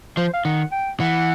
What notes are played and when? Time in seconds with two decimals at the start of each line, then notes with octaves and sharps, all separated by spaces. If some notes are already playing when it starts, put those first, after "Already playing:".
0.17 F3 C5
0.34 F5
0.45 D#3 F#5
0.72 G5
1.00 E3 F#5